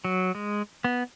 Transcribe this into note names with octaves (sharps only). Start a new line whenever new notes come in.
F#3
G#3
B3